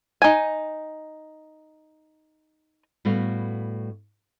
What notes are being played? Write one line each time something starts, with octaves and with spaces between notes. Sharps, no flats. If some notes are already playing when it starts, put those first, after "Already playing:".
D#4 G#5
A2 G3 B3 F#4 A4 F5